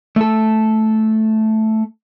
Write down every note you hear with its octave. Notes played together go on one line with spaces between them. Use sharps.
A3 A4